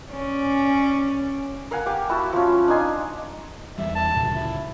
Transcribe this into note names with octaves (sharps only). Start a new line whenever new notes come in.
C#4 D5
A#4 F5 F#5 G#5
G4 G#5 D6
E4 F#4 E5 A5
F3 C#4
D4 D#4 G#5 C6
E2 E3 G3 E5
A5
D2 A#2 C#3
E4